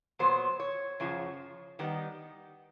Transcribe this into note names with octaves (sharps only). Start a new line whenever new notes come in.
A#2 F#3 B3 C5
C#5
F#2 C#3 F3
D#3 G3 B3 D#4